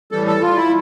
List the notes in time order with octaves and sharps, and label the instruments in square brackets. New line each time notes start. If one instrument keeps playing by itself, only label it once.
[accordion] A2 E3 G3 A4
A4
F4
E4